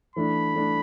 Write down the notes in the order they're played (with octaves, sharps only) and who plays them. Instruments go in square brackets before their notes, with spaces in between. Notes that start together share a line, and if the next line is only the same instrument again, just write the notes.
[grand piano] E3 A3 D4 [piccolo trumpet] B5
[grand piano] E3 A3 D4